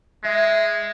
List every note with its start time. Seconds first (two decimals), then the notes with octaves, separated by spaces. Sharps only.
0.24 G#3 E5